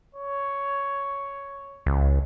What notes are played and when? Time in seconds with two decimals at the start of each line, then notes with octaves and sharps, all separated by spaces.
0.15 C#5
1.86 C#2